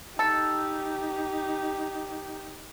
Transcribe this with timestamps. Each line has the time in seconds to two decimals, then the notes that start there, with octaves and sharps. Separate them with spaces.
0.19 D#4 G4 A4